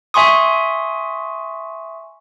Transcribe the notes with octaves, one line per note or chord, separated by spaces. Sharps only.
E5 G#5 C6 C#6 D#6